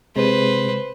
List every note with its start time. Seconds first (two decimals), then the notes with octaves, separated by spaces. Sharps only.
0.16 C3 G#3 B4 C5